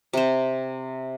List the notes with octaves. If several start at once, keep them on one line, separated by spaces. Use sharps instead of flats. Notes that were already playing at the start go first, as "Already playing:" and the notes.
C3 C5